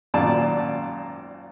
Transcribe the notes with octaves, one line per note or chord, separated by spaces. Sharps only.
G#1 F#2 A#2 D5 A5